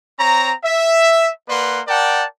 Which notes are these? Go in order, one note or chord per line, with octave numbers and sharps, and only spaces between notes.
C4 C#5 A#5
E5
A#3 B4 D5 F#5 C6
A#4 D5 F#5 G5 A5